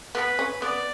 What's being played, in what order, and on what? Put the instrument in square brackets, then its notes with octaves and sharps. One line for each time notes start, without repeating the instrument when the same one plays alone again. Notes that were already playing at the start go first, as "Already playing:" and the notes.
[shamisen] B3 [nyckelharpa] B4
[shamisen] C#4
[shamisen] B3 [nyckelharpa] D5